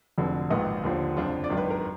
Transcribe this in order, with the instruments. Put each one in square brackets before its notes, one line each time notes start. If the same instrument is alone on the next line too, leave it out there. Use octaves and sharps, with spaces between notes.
[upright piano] F1 F2 D3 F#3
A#1 G#2 D#3 F#3 B4 D#5
D#2 D3 F3
F#1 F2 F3 D4 F4
D5
G#1 F#2 D#3 F#3
B4
A#4